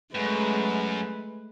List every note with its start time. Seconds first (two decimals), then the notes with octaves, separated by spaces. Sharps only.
0.15 F#2 G#3 A3 B4